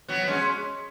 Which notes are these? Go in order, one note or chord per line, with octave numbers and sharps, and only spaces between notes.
F#3 B3
G#3 C#4